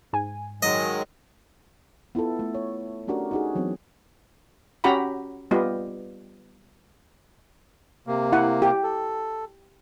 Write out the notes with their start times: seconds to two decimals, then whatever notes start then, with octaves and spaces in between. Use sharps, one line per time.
0.13 G#2 G#5
0.63 D#3 F#3 G#3 D#5
2.15 B3 E4 F4 A4
2.39 A3
2.55 C#5
3.07 A3 C#4 D4 F#4 G4 A#4
3.31 D#4 F#4 G#4
3.55 E3 F#3 B3 C4
4.84 C#4 F#4 G4 F#5 A#5 B5
5.51 G3 B3 F4 G4 D#5
8.07 C3 A#3
8.32 E4 F#5
8.62 G4
8.83 A4